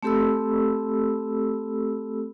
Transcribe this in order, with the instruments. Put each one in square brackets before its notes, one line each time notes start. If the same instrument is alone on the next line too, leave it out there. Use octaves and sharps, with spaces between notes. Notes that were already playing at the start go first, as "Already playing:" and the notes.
[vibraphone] A3 C4 G4 A4 B5 E6